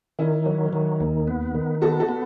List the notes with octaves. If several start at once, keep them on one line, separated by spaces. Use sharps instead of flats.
D#3 C#4 E4
F#3
D#3
D#2
B3
D#3
B3 F#4 A4
F#4 A4
B3